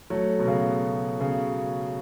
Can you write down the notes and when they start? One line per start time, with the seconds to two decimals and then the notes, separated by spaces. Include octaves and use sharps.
0.10 F#3 A3
0.39 B2
0.47 C#3
1.20 C#3